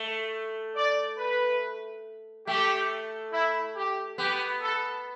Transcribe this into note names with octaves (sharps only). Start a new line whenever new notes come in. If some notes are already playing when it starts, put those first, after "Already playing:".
Already playing: A3
D5
B4
A3 G4
E4
G4
B3 G4
A4